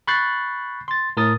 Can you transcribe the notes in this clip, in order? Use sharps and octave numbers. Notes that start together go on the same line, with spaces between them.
B5 C#6 F#6 G6 A6 C7
C6 A6
A2 A#4 D#6 A6